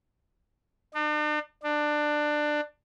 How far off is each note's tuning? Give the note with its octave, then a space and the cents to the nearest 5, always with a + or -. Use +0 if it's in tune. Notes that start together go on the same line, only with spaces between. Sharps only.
D4 +45
D4 +20